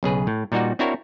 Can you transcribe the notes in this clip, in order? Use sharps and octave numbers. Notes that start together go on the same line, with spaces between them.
B1 C#3 G#4 B4
A2
A#2 G3 D#4 F#4 F#5
C4 D4 E4 F#4 A#4 C#5